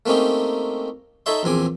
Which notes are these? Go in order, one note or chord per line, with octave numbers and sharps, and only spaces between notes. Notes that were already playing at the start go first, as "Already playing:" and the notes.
A3 A#3 C4 C#4 D#4 G4
D#4 A4 C#5 E5 C6
A#1 E2 C4 G#5 D6